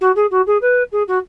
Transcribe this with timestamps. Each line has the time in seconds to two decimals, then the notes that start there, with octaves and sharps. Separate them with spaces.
0.01 F#4
0.15 G#4
0.31 F#4
0.47 G#4
0.61 B4
0.92 G#4
1.08 F#4